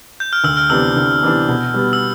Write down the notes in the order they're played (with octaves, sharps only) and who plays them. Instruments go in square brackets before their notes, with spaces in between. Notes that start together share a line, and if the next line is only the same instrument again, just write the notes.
[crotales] G6
F6
[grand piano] D2 [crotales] E6
[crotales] F6
[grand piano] C3 E3 B3 D4 [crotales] E6
[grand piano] D2
C3 E3 B3 D4
B2
G3 B3
[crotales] E6